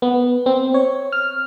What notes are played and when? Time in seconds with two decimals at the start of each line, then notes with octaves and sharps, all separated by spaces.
0.02 B3
0.46 C4
0.74 C#5
1.12 F6